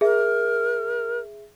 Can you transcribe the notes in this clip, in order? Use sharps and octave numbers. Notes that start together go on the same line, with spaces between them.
G#4 A#4 E5